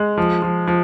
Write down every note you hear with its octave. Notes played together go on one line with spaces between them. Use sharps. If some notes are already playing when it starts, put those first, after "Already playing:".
Already playing: G#3
F3
F3
F3